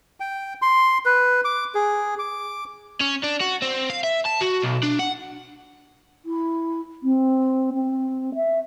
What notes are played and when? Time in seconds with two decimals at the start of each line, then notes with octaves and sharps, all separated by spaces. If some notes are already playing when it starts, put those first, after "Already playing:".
0.20 G5
0.62 C6
1.05 B4
1.45 D6
1.74 G#4
2.19 D6
3.01 C#4
3.23 D4
3.40 F#4
3.62 C4
3.90 F5
4.03 E5
4.25 A5
4.41 F#4
4.62 B1
4.83 D4
4.99 F#5
6.25 E4
7.03 C4
7.74 C4
8.35 E5